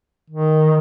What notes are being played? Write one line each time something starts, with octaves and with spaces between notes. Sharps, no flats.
D#3